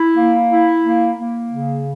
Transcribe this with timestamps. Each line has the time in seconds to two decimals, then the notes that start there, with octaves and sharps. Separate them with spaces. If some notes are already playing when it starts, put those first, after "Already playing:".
Already playing: E4
0.16 A#3
0.50 E4
0.84 A#3
1.18 A#3
1.50 C#3